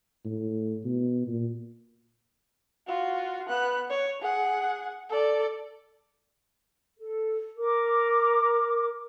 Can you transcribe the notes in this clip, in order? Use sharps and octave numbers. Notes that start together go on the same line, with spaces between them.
A2
B2
A#2
F4 F#4
B3 F#6
C#5
G#4 F#5
A4 D5
A4
A#4 D6